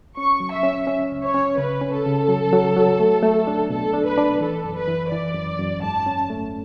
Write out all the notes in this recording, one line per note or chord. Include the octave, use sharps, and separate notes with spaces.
C#4 C#6
F#3
E5
C#4
C#4
C#2
C#5
C#4
C#3 B4
C#4
A4
C#3
F#3
F#3
F#3
A3
A3
D4
B2 A4
D4
B4
D4
E3 A4
F#2
B4
E3
E3 D5
F#2
F#2
G#2 A5
C#4
A3